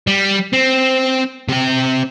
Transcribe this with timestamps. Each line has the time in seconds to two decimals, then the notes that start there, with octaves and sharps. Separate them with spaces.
0.07 G3
0.53 C4
1.49 C3 G5